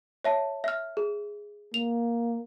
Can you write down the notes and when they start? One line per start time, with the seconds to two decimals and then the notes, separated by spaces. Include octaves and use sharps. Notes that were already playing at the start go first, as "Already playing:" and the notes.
0.25 C#5 E5 A5
0.64 E5 F6
0.97 G#4
1.74 A#3 F7